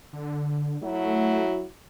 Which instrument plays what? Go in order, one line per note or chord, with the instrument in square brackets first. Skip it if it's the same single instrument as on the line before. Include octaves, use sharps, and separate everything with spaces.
[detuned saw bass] D3
[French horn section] F#3 E4 F#4 [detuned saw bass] A3